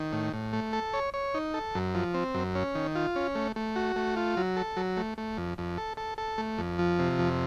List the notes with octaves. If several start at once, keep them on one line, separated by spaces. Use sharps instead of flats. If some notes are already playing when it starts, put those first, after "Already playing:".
Already playing: D#3
A2
A2
A3
A4
C#5
C#5
D#4
A4
F#2
F3
C4
F#2
C#4
D#3
F4
C#4
A3
A3
F#4
A3
F4
F#3
A4
F#3
A3
A3
F2
F2
A4
A4
A4
A3
F2
F3
C3
F2